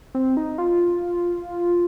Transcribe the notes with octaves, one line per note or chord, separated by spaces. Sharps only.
C4
D#4
F4